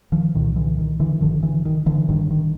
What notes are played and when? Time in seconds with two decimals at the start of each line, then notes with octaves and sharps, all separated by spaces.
0.12 D#3 F3
0.34 C2 A#2 D#3
0.56 D3 E3
0.78 D#3
1.00 D3 E3
1.21 A1 G2 D3 D#3 F3
1.43 D3 E3
1.65 D#3
1.86 D3 E3
2.08 A1 G2 D3 D#3
2.30 D#3